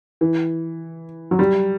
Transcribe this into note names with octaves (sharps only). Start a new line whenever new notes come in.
E3
F#3
G3